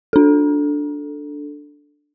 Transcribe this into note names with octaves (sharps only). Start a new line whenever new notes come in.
D4 A4